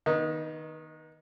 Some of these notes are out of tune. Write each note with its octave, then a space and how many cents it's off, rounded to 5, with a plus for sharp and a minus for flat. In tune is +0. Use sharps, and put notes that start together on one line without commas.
D#3 +0 B3 -40 D#4 +0